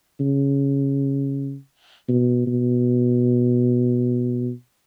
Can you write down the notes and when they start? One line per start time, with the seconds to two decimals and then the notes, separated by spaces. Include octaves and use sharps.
0.20 C#3
2.09 B2
2.47 B2